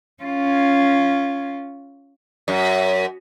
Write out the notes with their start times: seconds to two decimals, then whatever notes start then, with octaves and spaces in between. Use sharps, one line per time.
0.23 C#4 F4
2.48 F#2